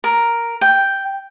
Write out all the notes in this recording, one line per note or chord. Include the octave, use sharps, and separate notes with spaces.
A#4
G5